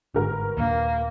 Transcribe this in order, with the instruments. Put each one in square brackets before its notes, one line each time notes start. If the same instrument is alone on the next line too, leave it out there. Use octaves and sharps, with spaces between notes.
[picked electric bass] G1 G#2 D3 [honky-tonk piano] F#4 A#4 B4
[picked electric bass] D#2 A#2 D4 [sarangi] A#3